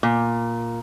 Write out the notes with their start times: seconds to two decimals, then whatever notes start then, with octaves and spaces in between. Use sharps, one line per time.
0.03 A#2